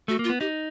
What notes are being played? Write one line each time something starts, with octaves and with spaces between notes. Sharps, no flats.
A3 F#4
A#3
F4
B3
D#4 G4